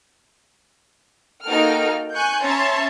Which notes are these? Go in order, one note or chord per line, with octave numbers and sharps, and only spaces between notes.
A#3 D#4 F#4 A4 G5 F6
G#5 C#6 F#6 G6
C#4 C#5 E5 A5 A#5 C6